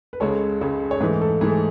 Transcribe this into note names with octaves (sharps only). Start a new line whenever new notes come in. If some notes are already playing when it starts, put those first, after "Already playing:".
B4
C#2 C#3 G#3 A4 C#5
C#2 C#3 G#3
C#5
G#2 E3 A3 G#4 B4
A4
G#2 E3 A3 G#4